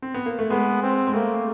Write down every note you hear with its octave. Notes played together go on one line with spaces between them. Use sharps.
C4
B3
A#3
A3
G#3 B3
C4
G#3
A3 A#3